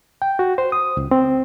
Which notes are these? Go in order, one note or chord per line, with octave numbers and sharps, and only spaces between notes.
G5
F#4
C5
D#6
C#2
C4